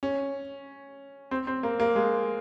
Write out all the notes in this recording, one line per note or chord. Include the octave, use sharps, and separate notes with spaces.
C#4
C4
C4
A#3
A#3
G#3